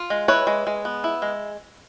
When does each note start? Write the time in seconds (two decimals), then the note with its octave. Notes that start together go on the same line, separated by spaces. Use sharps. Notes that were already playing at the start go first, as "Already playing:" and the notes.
Already playing: F4
0.10 G#3
0.28 E4 B4 C#5
0.47 G#3
0.67 G#3
0.85 B3
1.04 E4
1.22 G#3